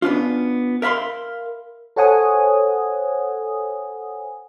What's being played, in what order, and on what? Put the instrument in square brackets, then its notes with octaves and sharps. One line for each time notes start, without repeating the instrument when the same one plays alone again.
[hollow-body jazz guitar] B3 C#4 D4 F4
A#4 E5 F5 B5 C6
[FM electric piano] A4 C5 C#5 F#5 G#5 D#6